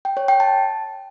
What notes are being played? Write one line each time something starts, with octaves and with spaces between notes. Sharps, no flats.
G5
C#5
G5
A5